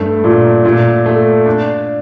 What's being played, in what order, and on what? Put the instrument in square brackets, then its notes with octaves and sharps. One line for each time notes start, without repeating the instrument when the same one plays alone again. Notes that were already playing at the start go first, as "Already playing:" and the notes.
Already playing: [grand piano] G2 A3
A#2
A#2
A3
D4